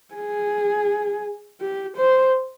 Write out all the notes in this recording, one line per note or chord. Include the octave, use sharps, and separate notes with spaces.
G#4
G4
C5